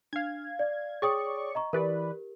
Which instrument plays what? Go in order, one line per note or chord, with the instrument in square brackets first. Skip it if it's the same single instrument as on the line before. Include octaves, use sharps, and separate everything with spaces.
[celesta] D4 [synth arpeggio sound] F5 G#6
[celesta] D5
[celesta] G#4 G5 D#6 [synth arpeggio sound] C#5 D5 C#6
[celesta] D#5 A#5 C#6
[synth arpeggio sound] E3 B4 D5 [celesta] G4 A#4